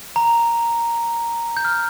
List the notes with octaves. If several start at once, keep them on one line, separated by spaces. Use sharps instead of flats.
A#5
G6
F6